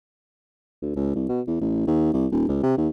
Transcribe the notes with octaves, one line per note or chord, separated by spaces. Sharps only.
D2
C#2
C2
B2
E2
A1
D#2
C2
D#1
C#2
C3
D#2